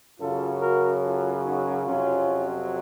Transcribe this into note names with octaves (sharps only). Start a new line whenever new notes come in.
F#2 C#3 F#3 F4 A4
F#4 A#4
F4 A4
D#4 F#4
F2 C3 F#3 C#4 F4